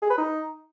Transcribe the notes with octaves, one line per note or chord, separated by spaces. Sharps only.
G#4
B4
D#4